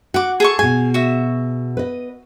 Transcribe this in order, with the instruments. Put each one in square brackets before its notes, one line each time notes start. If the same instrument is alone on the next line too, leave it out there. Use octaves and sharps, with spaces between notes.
[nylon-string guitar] F#4 [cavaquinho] F#5 D6
[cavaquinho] G#4 A4 C#6
[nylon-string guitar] B2 G#4 [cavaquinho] G#5
[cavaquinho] F#4 E5
[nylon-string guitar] B4 D#5